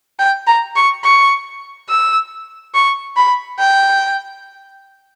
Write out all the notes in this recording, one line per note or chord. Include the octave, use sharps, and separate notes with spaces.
G5
A#5
C#6
C#6
E6
C#6
B5
G5